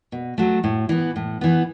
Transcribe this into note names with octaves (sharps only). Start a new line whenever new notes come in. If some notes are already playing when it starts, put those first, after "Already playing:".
B2
F#3 A3
A2
E3 B3
A2
E3 B3